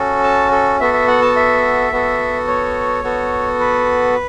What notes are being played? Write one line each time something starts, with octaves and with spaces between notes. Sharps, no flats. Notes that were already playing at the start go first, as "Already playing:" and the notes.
Already playing: C#4 F#4 A4
A5
A4
B3 F#4 A4 E5
E5
F#5
A5
E5
B3 F#4 A4
C#5
B3 F#4 A4
B4